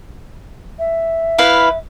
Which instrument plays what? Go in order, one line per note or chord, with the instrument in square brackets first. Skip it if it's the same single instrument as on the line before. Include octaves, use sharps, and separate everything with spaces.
[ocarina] E5
[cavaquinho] E4 B4 F5